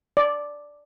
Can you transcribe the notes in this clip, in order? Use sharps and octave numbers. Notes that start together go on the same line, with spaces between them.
D5